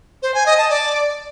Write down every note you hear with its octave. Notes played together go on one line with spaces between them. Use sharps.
C5
G#5
D#5
A5
D5